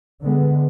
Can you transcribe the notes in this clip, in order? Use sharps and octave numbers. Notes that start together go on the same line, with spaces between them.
D3 G#3 B3